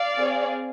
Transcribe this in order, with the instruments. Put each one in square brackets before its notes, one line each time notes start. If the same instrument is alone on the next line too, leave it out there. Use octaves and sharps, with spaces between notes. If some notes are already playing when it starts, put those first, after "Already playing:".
Already playing: [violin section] D5 F5
C4 G#4